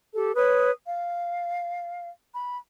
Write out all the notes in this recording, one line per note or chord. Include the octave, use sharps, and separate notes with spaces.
G4 A4
B4 C#5 D#6
F5
B5